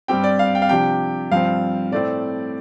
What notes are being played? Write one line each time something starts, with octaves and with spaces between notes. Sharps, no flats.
G2 G3 C4 G4 G5
D5
F5
G5
F5
C3 F3 D4 G4 G5
G2 F3 C4 F5
A2 A3 C4 D5